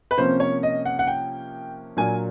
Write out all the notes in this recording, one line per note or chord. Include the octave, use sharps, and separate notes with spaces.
B4
C3 F3 A#3 C#4 C5
C#5
D#5
F#5
F#5
G5
A#2 F#3 A#3 D4 G#5